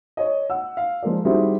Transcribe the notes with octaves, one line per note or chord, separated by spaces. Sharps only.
C#5 D#5
F#5 E6
F5
F3 G#3 A#4 D5
D#3 G3 C4 E4 F#4 G#4